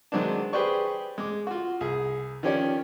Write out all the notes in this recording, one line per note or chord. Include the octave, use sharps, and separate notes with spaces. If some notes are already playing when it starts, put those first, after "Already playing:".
D#3 F#3 G#3 C4 D4
G4 G#4 B4 C5 D5 C#6
G#3 D6
F4 F#4
C2 G#4
D#3 F3 C#4 G4 C#5 D5